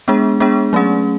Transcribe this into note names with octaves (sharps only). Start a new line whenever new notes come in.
G#3 B3 D4 G#4
G#3 B3 D4 G#4
F#3 A3 C#4 G#4